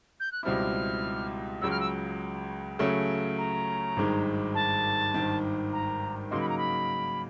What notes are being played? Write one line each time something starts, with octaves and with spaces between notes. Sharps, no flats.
G6
F#6
C#2 B2 G3 C4 E4 F6
C#2 C#3 F#3 E6
F6
E6
C#3 F#3 A3 C#4
A#5
G#1 G2 D#3 G#3
A5
G#1 G2 D#3
A#5
C#3 F#3 A#3 D#4 C6
B5
A#5
B5